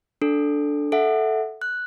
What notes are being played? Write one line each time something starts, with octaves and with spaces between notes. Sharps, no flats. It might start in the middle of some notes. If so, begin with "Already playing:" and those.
D4 A4
A4 E5 F#5
F#6